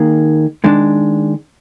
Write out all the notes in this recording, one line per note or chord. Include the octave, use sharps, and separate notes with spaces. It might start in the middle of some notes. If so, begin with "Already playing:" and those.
Already playing: D#3 A#3 D#4 G#4
D#3 G#3 D4